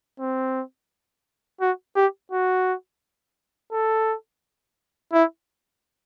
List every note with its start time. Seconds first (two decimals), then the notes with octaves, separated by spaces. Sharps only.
0.20 C4
1.61 F#4
1.96 G4
2.32 F#4
3.72 A4
5.13 E4